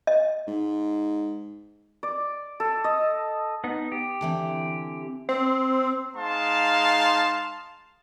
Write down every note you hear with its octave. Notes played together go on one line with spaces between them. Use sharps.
D#5
G#2
D5
A4
D#5
B3 D#4
G4
D3 E3 C4
C4
G#3 D#4 F5 A5 C6